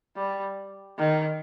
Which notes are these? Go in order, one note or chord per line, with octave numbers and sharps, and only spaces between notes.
G3
D#3